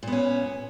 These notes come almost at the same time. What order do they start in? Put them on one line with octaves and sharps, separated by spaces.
A#2 B3 C#4